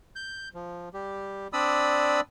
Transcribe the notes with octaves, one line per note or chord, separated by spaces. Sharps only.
G6
F3
G3 G4
C4 D4 D5 B5 D#6 E6